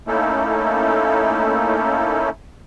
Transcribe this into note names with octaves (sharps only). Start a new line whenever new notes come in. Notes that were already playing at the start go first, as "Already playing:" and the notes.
A3 A#3 C#4 D#4 E4 A4